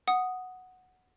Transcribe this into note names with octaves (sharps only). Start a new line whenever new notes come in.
F#5 D#6